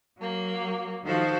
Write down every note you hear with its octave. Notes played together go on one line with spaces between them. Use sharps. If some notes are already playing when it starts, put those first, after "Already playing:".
F#3 A#3
D#3 F3 F#4 A4 C5